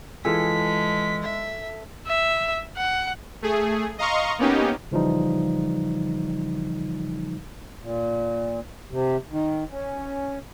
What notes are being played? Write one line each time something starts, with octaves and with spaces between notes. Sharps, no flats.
E3 G#3 F4 G#4 A4 B6
E5
E5
F#5
A3 G#4
D#5 F5 A#5 C6 C#6
A#3 B3 C#4 D#4 G4
C#3 E3 F3 G3 D#4
A#2
C3
D#3
C#4